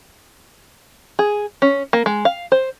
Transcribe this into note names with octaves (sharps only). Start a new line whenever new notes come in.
G#4
C#4
A#3
G#3
F5
C5